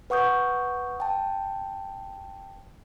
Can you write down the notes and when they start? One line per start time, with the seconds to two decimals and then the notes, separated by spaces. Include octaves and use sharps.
0.10 B4 F#5 C#6 D#6 G6
1.00 G5 A5